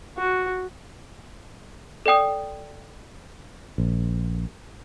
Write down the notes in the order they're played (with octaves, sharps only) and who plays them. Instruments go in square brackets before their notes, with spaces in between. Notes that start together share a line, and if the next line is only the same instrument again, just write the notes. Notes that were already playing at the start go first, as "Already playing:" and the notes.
[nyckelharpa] F#4
[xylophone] A4 D5 G5 D#6
[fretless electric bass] A#1